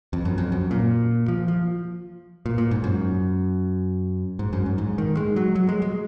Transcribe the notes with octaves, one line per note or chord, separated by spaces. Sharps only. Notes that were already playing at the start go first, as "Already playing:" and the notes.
F2
F#2
F2
F#2
A#2
F3
F3
A#2
A#2
G#2
F#2
G#2
F#2
F#2
G#2
D#3
G#3
F#3
F#3
G#3
G#3